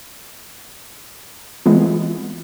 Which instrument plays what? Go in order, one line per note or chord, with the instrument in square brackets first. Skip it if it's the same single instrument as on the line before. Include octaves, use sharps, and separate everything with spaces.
[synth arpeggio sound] E3 G#3 A3 B3 C4 F4